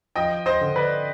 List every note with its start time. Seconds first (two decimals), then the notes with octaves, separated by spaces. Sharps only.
0.16 F3 D#5 G5
0.46 C5 D#5
0.61 D3
0.76 B4 D5